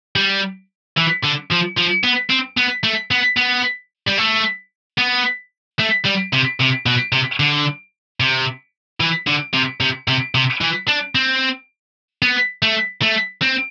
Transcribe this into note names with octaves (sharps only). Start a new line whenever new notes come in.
G3
E3
D3
F3
F3
B3
C4
B3
A3
B3
B3
G3
A3
B3
A3
G3
C3
C3
B2
C3
D3
C3
E3
D3
C3
C3
C3
C3
E3
D4
C4
B3
A3
A3
C4